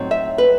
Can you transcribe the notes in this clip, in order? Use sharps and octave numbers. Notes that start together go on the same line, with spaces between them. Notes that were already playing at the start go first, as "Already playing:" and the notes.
Already playing: A2 F#3 C4 D#4
E5
B4